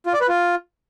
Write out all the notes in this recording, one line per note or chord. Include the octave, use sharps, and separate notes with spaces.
F4
D5
B4
F4